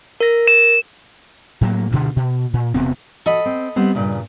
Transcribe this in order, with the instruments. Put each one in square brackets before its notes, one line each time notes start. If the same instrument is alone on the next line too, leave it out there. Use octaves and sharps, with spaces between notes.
[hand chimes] A#4 A#6
[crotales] E7
[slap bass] A2 F#3 A#3
D2 G2 B2 D3
B2
A#2
E1 C3 B3 C4
[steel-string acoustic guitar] F#4 [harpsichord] A4 D#5 B5
[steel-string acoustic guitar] C4
G3 B3 C4
G2 A#2 C#3